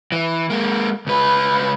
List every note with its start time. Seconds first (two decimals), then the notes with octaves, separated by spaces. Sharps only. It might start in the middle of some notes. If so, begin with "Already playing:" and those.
0.12 E3
0.50 G#3 A#3
1.07 C#2 B4